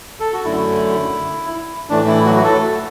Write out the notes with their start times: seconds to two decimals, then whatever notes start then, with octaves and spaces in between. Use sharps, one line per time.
0.20 A4
0.33 F#4
0.45 F#2 D3 A3 E4
1.89 A2 E3 A3 D4
2.07 E4
2.26 F#3 F#4
2.36 F#4
2.44 A3 A4